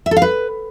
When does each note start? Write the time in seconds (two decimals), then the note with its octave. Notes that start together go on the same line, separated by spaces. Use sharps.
0.06 E5
0.11 A4
0.17 F5
0.22 B4